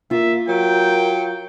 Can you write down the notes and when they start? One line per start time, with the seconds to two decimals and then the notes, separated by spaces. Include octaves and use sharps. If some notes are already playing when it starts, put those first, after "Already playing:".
0.11 A#3 F4 E5
0.49 F#3 A#4 G5